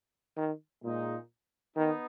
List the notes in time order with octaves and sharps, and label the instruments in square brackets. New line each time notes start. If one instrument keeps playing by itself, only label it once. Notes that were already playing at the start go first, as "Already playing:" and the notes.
[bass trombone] D#3
[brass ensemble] A#2 G#3 D#4
[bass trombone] D#3 [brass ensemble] B3 D#4